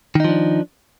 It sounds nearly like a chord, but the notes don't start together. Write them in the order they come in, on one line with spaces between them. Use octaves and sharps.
D#3 D#4 F3 D4